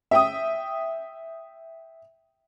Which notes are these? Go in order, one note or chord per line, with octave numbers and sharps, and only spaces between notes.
E5 G5 D#6